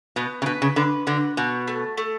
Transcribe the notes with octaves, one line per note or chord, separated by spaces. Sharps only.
B2 B3
C#3
B2 B4
C#3
D3 B4
D3 F#4
B2 F#4
A3
A3